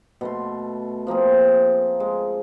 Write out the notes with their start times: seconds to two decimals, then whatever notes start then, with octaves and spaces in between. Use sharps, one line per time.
0.21 B2 A3 C6
1.07 F3 A#3 C4 G#4
2.00 G#3